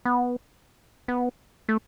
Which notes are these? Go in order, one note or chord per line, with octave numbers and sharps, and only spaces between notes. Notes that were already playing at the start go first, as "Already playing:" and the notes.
B3
B3
A3